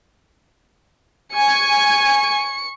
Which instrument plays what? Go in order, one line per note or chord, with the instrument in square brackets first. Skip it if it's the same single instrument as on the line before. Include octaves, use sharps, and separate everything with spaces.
[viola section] G#5 [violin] C#6 C#7